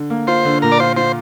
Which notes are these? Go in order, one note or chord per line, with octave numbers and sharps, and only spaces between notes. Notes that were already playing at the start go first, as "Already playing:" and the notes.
Already playing: D3
A#3
F4 C5
D3
A#2 A#4
D5
F4 C5
F4 C5